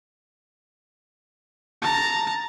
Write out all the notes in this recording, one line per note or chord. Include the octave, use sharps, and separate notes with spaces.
A5 A#5